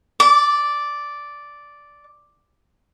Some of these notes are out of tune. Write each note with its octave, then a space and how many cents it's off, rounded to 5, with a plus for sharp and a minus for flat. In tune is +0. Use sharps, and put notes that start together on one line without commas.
D5 -5 D6 -30